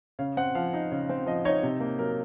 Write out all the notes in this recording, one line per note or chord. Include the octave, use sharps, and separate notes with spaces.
C#3 F5
C4 F#5
F3 F5
D#4
C#3
C4
F3 D#5
D#4 C#5
C3
A#3
F#3 A#4